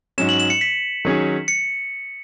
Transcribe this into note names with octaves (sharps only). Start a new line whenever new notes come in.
G#2 F#3 C#4 E7
F#7
E7
C#7
B6
D#3 F#3 C#4 G#4
C#7